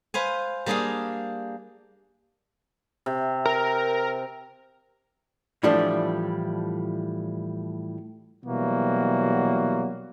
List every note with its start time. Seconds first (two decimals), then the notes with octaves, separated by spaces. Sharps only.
0.14 B4 C5 F5 G#5
0.66 G3 A#3 D4 G#4 D#5 F5
3.06 C3
3.46 A#4
5.63 A2 E3 F3 G3 A3 D4
8.45 B2 E3 F#3 G3 A#3 F#4